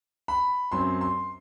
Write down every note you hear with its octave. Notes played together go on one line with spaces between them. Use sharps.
B5
F#2 F#3 C4 C6
C6